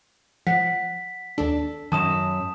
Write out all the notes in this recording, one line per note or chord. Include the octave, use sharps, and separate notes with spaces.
F3 F#5 B6
D#2 D4 A4
F#2 D#3 C#4 A5 D#6 E7